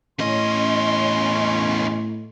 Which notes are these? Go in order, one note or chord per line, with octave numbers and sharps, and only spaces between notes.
E2 A2 C#4 D#5 C6